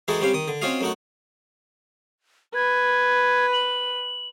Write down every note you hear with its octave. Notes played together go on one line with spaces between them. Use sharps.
E3 G#3 D#4 E4 F#4 A4
G3 C4 C#4 G4 F5
D#3 D#6
D3
C4 C#4 F4 F#4 D#5 F5
F#2 A3 D#4 F#4 F#5
B4 G#6
F#7